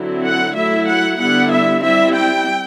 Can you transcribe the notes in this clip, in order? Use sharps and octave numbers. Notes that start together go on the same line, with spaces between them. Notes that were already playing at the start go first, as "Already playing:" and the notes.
Already playing: D3 F#3 C4 E4
F#5
F#3 A3 E4 E5
F#5
D3 G3 B3 E4 F#5
E5
G3 C4 E4 E5
G5